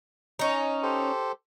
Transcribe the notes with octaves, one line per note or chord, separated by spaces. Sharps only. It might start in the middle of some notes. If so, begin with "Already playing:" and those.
C#4 D#4
G4 A4 C5